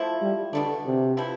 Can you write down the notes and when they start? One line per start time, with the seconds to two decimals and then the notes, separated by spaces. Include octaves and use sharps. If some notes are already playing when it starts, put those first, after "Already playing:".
Already playing: F3 A3 E4
0.22 G3
0.53 B2 D3 A3 D4
0.86 C3
1.17 C3 F3 B3 E4